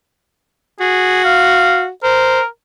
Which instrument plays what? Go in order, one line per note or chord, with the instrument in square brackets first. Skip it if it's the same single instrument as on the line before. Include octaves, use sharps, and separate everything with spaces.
[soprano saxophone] F#4 [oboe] G#4
[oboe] F5
[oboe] A#4 [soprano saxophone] C5